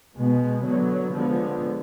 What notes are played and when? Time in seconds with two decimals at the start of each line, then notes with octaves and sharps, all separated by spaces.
0.15 B2 G#3 B3
0.64 D3 F#3 B3
1.13 D3 F3 G#3 B3